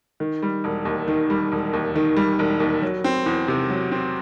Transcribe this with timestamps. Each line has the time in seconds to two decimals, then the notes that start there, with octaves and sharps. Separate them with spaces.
0.20 D#3
0.43 G3
0.64 E1
0.85 D#2
1.08 D#3
1.30 G3
1.52 E1
1.73 D#2
1.95 D#3
2.16 G3
2.39 E1
2.60 D#2
2.82 F#3
3.04 C4
3.26 E2
3.48 C3
3.70 F#3
3.92 C4